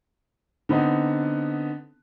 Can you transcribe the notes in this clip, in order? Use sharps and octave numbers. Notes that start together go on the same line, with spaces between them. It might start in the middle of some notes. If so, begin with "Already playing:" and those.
D3 B3 C4 D#4